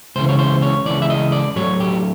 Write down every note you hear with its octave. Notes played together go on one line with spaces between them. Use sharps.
C#2 C#3 E3 C5
C#5
C5
C#5
C#2 C#3 E3 D5
E5
D#5
D5
A2 F#3 A3 C#5
G4